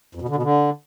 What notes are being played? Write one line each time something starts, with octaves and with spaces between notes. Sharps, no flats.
F2
B2
D3
B2
D3